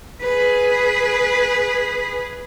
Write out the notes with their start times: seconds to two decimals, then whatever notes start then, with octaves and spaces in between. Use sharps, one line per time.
0.22 G#4 B4